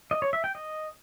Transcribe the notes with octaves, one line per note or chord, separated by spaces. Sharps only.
D#5
C#5
E5
G5
D#5